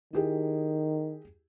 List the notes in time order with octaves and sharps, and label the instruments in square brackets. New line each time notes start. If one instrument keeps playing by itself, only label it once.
[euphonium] D#3 [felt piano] E4 G4 G#4